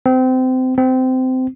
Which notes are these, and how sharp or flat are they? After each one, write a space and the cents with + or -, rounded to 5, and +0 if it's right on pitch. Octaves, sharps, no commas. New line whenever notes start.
C4 -25
C4 -20